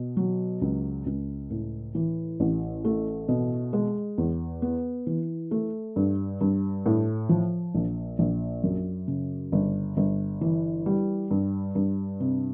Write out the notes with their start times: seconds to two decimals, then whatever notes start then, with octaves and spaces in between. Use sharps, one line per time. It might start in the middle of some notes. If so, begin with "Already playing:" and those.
Already playing: B2
0.17 F#3
0.61 C#2
1.06 C#2
1.50 A2
1.95 E3
2.40 A1
2.85 A3
3.28 B2
3.73 G#3
4.18 E2
4.62 B3
5.07 E3
5.51 A3
5.96 G2
6.41 G2
6.86 A2
7.29 F3
7.75 A#1
8.19 A#1
8.64 F#2
9.08 C#3
9.52 G1
9.97 G1
10.41 E3
10.86 G3
11.31 G2
11.75 G2
12.20 C3